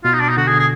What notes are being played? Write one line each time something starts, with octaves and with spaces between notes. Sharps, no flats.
B2 F4
D#4
D4
D#4
D3 F#4
G#4
G#4